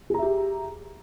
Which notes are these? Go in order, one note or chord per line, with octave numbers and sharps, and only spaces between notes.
G4 G#4 E5 A#5